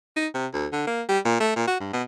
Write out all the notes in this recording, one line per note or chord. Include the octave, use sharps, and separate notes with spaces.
D#4
C3
D2
D3
A#3
G3
A#2
A3
A#2
F#4
G2
B2